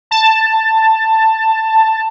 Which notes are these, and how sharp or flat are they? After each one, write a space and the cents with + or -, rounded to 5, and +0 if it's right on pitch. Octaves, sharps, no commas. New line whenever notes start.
A5 +10